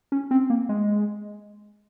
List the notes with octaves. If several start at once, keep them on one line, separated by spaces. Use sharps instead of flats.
C#4
C4
A#3
G#3